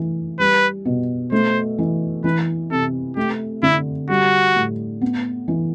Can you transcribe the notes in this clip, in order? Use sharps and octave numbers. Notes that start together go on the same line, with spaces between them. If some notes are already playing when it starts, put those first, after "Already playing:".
Already playing: E3 A3
G3 B4
B2
A3 C5
E3
E3 B4
C3 A4
A3 G4
D3 E4
G3 F#4
A2
B3
E3